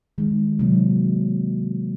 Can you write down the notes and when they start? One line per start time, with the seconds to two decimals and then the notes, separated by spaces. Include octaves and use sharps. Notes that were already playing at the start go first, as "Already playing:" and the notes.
0.18 D#3 G#3 D#4
0.59 C3 F#3 A#3 D#4